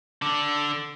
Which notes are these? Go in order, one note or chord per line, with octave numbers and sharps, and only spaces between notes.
D3 D4